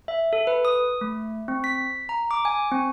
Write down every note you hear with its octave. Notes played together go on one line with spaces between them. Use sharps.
E5
A4
B4
D#6
A3
C4
B6
A#5
D6
G#5
C4